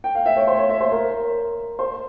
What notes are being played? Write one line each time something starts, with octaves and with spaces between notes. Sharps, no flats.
G5
F5
E5
C#5
C5
C#5
E5
C5
A#4
C5